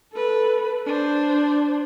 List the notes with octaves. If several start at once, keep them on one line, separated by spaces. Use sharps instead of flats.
A4 B4
D4 C5